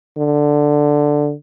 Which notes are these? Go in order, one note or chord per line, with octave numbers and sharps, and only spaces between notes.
D3